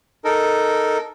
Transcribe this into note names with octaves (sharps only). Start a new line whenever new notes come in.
D#4 A4 A#4